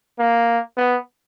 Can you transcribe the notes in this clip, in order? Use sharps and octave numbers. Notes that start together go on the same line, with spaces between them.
A#3
B3